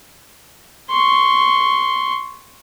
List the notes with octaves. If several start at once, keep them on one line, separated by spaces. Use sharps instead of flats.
C6 C#6